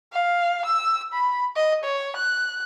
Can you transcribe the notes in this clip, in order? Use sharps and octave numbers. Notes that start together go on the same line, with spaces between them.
F5
E6
B5
D#5
C#5
F#6